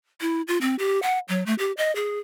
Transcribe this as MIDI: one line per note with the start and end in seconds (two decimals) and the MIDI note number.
0.21 0.42 64
0.48 0.58 65
0.61 0.75 60
0.79 1.00 67
1.02 1.19 78
1.29 1.43 54
1.46 1.54 57
1.59 1.72 67
1.77 1.94 75
1.96 2.19 68